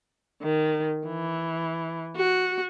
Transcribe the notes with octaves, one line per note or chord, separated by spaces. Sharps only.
D#3
E3
F#4